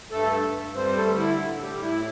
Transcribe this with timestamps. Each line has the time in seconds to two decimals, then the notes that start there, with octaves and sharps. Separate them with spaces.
0.11 G2 A3 A4
0.44 G2
0.75 G3 C4 C5
0.97 A3 A4
1.08 D3
1.18 E4
1.40 A2
1.57 A4
1.61 G3 G4
1.71 A2
1.82 E4